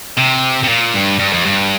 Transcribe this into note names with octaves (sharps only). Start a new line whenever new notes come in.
C3
C3
A#2
G2
G2
F2
G2